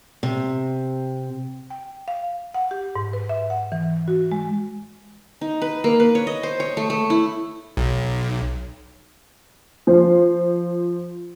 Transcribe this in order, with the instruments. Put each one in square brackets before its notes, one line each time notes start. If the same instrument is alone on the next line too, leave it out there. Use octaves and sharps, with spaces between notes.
[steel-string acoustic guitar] C3
[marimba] G5
F5
F#5
G4
G#2
B4
E5
F#5
E3
F#4
G#3
[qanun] D#4
B4
A#3
B4
C#5
D#5
C5
C#5
A3
A3
E4
[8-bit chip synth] B1
[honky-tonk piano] F3 C5